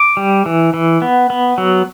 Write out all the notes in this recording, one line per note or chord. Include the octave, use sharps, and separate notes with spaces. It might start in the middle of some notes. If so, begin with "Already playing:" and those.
Already playing: D6
G3
E3
E3
B3
B3
F#3